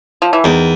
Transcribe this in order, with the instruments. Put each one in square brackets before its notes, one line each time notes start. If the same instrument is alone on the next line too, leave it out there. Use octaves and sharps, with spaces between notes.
[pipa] F3
E3
[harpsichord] E2 [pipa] D#3